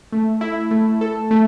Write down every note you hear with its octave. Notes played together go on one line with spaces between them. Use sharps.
A3
E4
A3
A4
A3